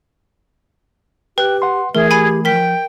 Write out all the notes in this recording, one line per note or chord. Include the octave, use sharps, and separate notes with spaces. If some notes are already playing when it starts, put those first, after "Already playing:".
G4 B4 G5 F#6
F#5 C6
E3 A3 G#4 A#4 E5
G4 G#5 B5 G#6
F3 A#4 G5 B6